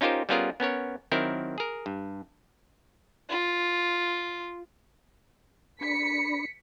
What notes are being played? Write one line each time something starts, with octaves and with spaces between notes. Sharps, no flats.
C#4 D#4 F4 G4 A#4 C5
G3 B3 C#4 F4 G#4 A#4
B3 C#4 A#4 C#5
D#3 F#3 C4 E4 A#4
G#4 A#4
G2
F4
D4 B5 B6 C#7